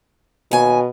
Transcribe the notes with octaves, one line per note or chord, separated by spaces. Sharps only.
D#2 B2 G#5